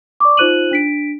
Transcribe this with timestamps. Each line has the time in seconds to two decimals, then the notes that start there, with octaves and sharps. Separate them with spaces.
0.20 D5 C#6 D6
0.37 D#4 F4 C5 F#6 D#7 F#7
0.71 D4 B6 D7